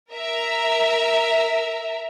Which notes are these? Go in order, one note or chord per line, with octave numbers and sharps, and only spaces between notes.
A#4 E5 A#5